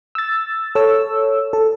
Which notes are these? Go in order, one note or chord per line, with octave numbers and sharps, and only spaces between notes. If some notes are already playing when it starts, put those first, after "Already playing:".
E6 A6
A4 C#5 E6
A4